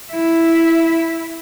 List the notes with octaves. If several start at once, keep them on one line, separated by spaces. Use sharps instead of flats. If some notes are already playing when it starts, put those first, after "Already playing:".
E4 E5